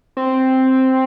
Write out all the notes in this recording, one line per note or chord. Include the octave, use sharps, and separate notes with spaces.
C4